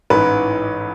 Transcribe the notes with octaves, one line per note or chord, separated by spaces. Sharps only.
A1 G#2 E3 B4